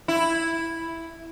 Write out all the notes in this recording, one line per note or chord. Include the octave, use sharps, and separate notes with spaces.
E4